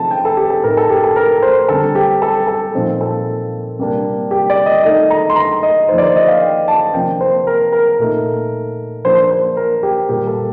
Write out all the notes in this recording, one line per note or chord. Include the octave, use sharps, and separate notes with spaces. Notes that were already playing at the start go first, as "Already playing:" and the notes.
Already playing: C3 F3 A3 C4 D#4 A5
G5
A4
G4
A4
A2 A3 D#4 A#4
A4
G4
A4
A#4
C5
D3 G3 C4 A4
G4
A4
A4
A#2 F3 C4 D#4
A4
C3 G3 A#3 D4
G4
D5
D#5
D#3 A3 D#4 D#5
A#5
C6
A#5
D#5
F3 A#3 D#4 C5
D5
C5
D#5
F5
G5
A5
C3 F3 A#3 D4 G5
C5
A#4
A#4
A#2 A3 D#4
F3 A#3 D4 C5
C5
A#4
G4
A#2 G3 A#3 G4
A4